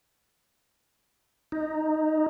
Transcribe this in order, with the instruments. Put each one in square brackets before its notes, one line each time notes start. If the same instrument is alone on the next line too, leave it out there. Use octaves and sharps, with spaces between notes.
[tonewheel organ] D#4